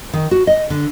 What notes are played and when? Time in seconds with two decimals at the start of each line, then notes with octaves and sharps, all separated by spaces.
0.13 D#3
0.31 F#4
0.47 D#5
0.70 D3